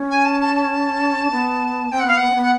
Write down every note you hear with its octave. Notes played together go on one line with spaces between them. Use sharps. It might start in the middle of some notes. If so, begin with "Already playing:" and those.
Already playing: C#4
G#5
A5
A5
A5
B3
C4 G5
F#5
B3 F5
B3 F#5
C4
B3
F#5